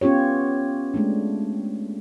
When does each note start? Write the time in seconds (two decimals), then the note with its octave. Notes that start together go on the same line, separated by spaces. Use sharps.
0.01 B3 C#4 F4 G4 C#5
0.94 G#3 A3 D4